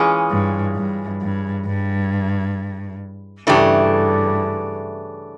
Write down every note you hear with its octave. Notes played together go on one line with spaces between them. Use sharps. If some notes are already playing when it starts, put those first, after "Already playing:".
Already playing: E3 G#3 C#4 F4 G#4
G2
G2
G2
G2
G2 C#3 E3 A3 D4 G4